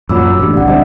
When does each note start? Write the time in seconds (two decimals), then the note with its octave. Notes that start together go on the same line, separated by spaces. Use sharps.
0.09 F#2 A#2 F#3 B5 D6 E6
0.40 A1 D4 G4
0.53 C2 D5 F#5
0.68 D3 G3 C4 D#5 E5